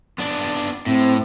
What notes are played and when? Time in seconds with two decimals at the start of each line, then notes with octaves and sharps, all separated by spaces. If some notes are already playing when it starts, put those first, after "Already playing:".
0.18 B3 D4
0.87 A2 C4